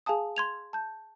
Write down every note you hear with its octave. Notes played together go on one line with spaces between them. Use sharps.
G#4 F5 G#5 A5 D#6
C6 G#6 F7
A5 G6